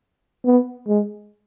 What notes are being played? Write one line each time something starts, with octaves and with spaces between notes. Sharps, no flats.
B3
G#3